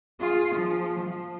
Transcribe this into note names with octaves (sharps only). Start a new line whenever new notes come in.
F4 G#4
F3
F3